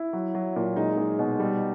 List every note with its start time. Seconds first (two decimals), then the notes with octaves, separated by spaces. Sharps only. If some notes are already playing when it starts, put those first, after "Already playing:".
Already playing: E4
0.13 F#3
0.35 F#3
0.56 A#2
0.76 G#3 D#4
0.98 G#3
1.19 B2
1.40 G3